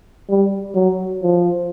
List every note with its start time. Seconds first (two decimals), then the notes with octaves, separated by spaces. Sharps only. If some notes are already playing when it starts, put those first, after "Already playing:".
0.30 G3
0.75 F#3
1.23 F3